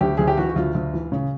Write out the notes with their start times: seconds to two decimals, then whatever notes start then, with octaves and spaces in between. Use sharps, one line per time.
0.01 D2 G4
0.17 D2 G#4
0.27 G4
0.37 E3 F#4
0.50 F#4
0.56 D2 F4
0.75 D2
0.93 E3
1.12 C#3